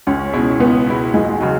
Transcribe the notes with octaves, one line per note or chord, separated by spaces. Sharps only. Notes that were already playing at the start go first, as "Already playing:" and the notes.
C#2 C#4
B2 G#3 E4
C#2 B3
B2 G#3 E4
E1 G#3
C#3 F#3